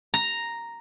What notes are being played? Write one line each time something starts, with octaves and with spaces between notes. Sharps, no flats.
A#5